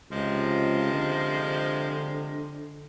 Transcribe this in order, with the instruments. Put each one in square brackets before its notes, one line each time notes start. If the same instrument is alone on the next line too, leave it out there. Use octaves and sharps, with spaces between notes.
[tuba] C#2 [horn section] C3 F3 G#3
[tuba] D3